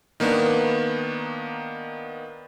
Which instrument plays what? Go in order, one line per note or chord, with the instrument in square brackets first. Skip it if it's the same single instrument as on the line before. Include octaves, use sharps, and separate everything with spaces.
[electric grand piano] D#3 A#3 B3 D4